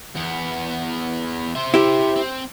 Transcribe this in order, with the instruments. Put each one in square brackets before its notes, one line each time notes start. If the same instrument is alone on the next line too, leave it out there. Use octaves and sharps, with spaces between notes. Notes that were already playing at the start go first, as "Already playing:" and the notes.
[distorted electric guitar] E2 B3
C5 E5
[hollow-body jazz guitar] E4 G4
[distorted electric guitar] C4